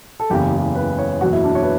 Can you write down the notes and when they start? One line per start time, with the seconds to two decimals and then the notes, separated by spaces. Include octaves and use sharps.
0.20 A4
0.30 F#1 E2 C#3 G4
0.53 G4
0.75 B4
0.99 C#5
1.21 F#1 E2 B2 F#3 F#4
1.33 E4
1.44 D4
1.55 C#5
1.63 B4